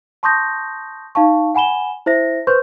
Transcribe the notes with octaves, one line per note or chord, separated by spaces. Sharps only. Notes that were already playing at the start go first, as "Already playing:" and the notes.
A5 C6 C#6 D#6 G6 A#6
D#4 F5 A5 C#6
F#5 G#5 B5 E7 G7
E4 C5 E5 A#6
B4 C5 C6 C#6 G6